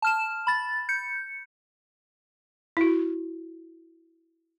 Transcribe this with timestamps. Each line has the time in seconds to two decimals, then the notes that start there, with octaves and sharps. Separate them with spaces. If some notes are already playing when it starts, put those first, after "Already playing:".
0.02 A5 F6 E7
0.47 B5 A6
0.89 G6 C#7
2.77 E4 F#4